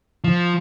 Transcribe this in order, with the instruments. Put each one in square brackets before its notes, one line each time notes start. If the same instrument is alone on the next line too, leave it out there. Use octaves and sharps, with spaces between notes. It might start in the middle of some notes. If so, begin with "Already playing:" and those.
[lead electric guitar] F3